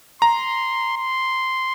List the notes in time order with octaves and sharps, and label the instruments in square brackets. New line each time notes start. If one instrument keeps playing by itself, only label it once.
[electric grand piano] A#5 [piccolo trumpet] C6
[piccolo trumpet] C6